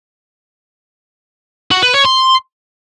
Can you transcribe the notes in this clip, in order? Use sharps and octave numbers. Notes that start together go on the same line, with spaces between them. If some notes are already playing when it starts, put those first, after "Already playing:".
F#4
B4
C#5
C6